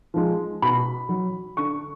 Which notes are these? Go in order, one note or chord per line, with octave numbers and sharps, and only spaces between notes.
F3 G#3
B2 B5
F#3
D3 C#6